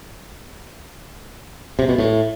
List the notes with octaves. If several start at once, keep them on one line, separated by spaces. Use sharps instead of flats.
C3
B2
A2